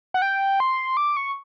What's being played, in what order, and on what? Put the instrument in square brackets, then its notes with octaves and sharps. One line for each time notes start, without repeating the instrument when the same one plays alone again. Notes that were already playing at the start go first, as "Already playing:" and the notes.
[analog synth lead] F#5
G5
C6
D6
C#6